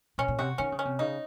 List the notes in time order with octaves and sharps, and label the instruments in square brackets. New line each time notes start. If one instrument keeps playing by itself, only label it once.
[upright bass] A#2 [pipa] C#4
[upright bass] A#2
[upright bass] C3 [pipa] F#4
[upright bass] D#3 [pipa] C#4
[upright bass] C#3
[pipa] C#4
[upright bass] C3
[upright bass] C#3 [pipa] D#4